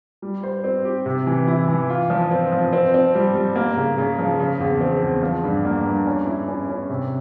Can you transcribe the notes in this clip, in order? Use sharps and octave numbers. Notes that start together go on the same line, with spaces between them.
G3
C5
C4
G4
C3
E3
E4
E3
F4
F3
C4
F3
C4
C4
G3
G3
A#3
C#3
C#3
F3
C#3
E2
C4
E2
F3
G2
A#3
G2
C#4
E4
C#4
C#4
C3